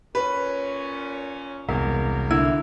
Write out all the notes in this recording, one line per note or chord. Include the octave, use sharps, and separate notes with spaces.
A#2 C#4 B4
E1 C2 A#3 B3 A#4
D3 E4